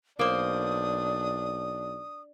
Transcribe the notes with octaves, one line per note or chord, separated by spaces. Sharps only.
B1 A#3 D4 C5 D#6